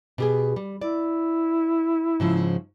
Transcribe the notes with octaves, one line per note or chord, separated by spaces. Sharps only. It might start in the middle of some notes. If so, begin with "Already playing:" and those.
B2 G4 G#4
G3
E4 D5
G#2 C#3 F3